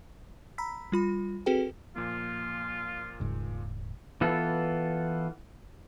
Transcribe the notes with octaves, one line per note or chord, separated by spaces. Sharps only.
A#5 B5 E6 B6
G3 F4 B5
C4 F#4 G#4 A4 B4 G5
A#2 F3 A#3 F4
D#1 G#2 C#3
E3 B3 F4 A4